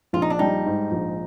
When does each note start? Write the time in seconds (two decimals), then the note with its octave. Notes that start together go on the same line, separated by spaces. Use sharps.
0.13 A#1 F4
0.22 D#4
0.30 D4
0.39 G3 D#4
0.66 G#2
0.91 A#1